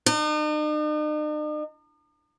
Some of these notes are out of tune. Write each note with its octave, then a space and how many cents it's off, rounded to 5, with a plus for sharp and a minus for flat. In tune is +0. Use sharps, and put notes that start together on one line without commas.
D#4 -45